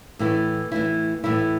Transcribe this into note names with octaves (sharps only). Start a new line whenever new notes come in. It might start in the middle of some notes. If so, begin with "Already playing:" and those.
A2 E3 A3 E4
A2 E3 A3 E4
A2 E3 A3 E4